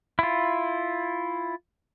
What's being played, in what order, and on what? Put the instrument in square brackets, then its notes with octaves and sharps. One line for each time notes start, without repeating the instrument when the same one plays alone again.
[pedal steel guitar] E4 F4